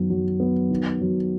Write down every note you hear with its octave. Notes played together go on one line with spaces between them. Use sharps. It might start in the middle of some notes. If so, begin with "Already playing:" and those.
Already playing: F#2 D#3 F#3 B3
F#3
B3
D#3
F#3